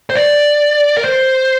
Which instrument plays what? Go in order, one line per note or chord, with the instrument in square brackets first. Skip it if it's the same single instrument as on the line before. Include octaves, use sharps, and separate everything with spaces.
[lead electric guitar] C5
D5
A#4
C5